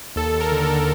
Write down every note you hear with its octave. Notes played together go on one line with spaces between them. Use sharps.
D#2 A4
D#2
A#4
D3
A4
D3